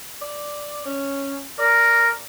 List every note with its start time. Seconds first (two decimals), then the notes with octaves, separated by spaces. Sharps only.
0.22 D5
0.85 C#4
1.59 A#4 D5